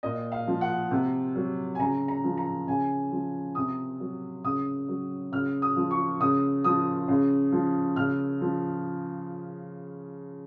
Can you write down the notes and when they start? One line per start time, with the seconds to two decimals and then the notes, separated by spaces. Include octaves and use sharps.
0.03 A#2 D#5
0.32 F5
0.47 F3
0.61 F#5
0.91 C3
1.36 F#3
1.75 G#5
1.79 C#3 A#5
2.08 A#5
2.24 F3
2.37 A#5
2.68 C#3 G#5
3.12 F3
3.55 C3 D#6
4.00 F#3
4.44 C#3 D#6
4.88 F#3
5.32 C#3 F6
5.62 D#6
5.76 F3
5.91 C#6
6.20 C#3 D#6
6.64 F3 D#6
7.08 C#3
7.52 F3
7.96 C#3 F6
8.41 F3